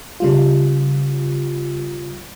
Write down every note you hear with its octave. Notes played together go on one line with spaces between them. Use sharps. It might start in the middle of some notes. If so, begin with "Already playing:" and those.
C#3 G3 F4